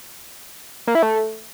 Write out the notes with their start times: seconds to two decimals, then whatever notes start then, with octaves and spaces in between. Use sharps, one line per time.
0.88 A#3
0.95 E4
1.03 A3